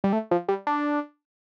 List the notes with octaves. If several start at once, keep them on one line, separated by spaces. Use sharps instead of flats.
G3
A3
F3
G3
D4